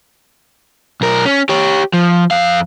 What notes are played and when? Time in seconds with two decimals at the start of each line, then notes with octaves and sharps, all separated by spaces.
1.01 B1 A#4
1.25 C#4
1.49 G4 C#5
1.93 F3
2.31 F2 F5